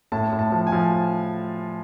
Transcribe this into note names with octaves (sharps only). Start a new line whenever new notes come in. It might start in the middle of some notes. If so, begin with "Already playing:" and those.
A2 A5
A2
A5
F3
G#5
F3